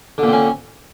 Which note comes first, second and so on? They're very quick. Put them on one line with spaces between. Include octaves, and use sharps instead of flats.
D3 A#2 C4 C#4